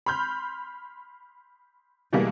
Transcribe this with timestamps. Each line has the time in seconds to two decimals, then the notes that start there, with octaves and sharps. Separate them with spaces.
0.06 B5 C6 F6 G6
2.13 B2 E3 G3 G#3 A#3 B3